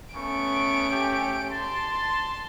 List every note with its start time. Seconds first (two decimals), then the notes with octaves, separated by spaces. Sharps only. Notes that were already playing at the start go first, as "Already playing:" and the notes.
0.15 A3 B3 C#4 C#6 D7
0.89 A3 G4
1.51 A5 C6